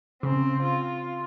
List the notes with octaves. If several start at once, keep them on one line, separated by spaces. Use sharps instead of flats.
C#3 C4
F4